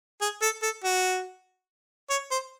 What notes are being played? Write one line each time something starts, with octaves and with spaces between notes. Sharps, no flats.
G#4
A4
A4
F#4
C#5
C5